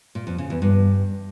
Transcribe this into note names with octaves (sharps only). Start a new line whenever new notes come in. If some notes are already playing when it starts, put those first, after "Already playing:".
A#2
F2
C#3
E2
G2